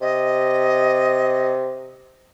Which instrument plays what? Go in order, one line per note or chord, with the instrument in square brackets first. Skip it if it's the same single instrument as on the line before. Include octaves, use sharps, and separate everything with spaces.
[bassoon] C3 [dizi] D#5